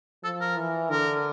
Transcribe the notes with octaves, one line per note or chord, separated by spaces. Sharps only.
F3 A4
A#4
E3
D3 A#4